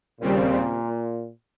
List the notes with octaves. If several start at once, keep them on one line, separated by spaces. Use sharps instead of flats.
D#2 A#2 C#3 G3 C4